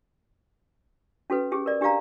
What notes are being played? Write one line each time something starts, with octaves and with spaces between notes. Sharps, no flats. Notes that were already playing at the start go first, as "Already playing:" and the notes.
C#4 F#4 A4 B4
C#4 G4 G#4
A#4 D5
D4 G4 D5 F5 A#5